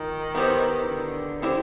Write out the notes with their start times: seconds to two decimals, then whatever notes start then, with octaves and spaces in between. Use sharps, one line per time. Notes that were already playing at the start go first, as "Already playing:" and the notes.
Already playing: D#3 F4
0.35 B3 E4 G4 C5
0.88 D3
1.42 C4 E4 G4 C5